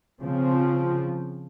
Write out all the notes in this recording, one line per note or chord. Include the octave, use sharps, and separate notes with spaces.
C#3 F3 C4